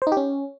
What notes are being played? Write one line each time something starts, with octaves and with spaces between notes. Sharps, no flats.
C5
D#4
G4
C#4